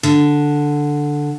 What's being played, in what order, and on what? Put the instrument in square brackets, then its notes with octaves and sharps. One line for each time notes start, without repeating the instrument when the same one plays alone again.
[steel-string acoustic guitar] D3